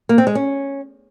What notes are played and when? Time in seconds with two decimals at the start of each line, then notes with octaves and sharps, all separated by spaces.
0.09 A#3
0.18 C4
0.27 G#3
0.35 C#4